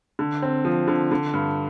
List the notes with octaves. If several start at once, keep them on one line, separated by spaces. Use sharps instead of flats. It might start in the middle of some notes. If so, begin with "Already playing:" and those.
D3
C4
F3
D3
D3
G2